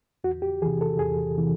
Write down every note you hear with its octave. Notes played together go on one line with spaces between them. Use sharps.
E2 F#4
G4
C3 E3 G#4
A4
E2 G#4
C3 E3